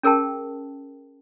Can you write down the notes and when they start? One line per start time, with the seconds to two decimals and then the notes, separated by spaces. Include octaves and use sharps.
0.03 C#4 G#4 A#4 G5 A5